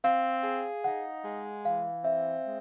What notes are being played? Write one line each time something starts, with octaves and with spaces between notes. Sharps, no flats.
C4 F5
G#4
D#4 F#5
G#3
E3 F5
C4 E5
G#3